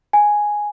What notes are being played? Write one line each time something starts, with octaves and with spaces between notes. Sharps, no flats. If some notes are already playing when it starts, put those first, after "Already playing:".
G#5